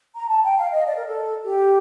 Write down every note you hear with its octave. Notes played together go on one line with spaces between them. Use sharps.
A#5
A5
G5
F5
D#5
D5
A#4
A4
G4